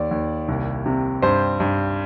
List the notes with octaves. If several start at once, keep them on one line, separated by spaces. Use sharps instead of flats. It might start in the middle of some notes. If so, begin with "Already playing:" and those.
Already playing: D#2 D5
D#2
C2
C3
G2 C5
G2